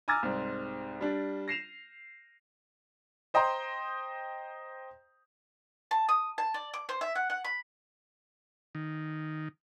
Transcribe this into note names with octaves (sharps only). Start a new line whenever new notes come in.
G#5 A#5 D6 E6 F6 A6
C2 G#2 C4
G3 D4
A#6 C7 E7 F7
C5 D#5 G5 A#5 C6
A5
D#6
A5
D5
D6
C5
E5
F#5
F#5
B5
D#3